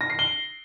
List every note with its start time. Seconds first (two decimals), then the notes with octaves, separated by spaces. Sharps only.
0.01 A#6
0.10 C7
0.19 G7